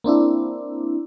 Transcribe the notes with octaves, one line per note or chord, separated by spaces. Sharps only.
A#3 C4 D4 E4